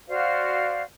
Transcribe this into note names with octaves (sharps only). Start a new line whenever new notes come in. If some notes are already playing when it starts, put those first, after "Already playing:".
F#4 C5 D5 F5